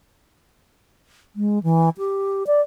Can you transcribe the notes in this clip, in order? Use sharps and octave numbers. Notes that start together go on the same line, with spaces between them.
G#3
E3
G4
D5